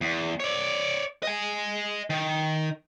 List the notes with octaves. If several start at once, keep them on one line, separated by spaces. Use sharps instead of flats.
E2
C#5 D5
D#5 G#5
D#3